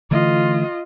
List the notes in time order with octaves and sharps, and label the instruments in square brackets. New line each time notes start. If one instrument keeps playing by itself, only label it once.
[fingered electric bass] D3 E3 A3 [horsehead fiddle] F4 D#5